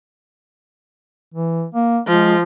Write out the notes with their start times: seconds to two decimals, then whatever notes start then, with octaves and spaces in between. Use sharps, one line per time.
1.34 E3
1.75 A#3
2.07 F3 G#3